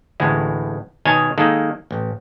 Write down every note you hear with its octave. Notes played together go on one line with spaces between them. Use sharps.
A1 D2 A2 G#3
B2 D#3 C#5 D#5 G#5 A5
D#3 G#3 A#3 D#4 A4
A1